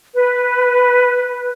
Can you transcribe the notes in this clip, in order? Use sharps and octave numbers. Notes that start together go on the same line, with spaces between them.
B4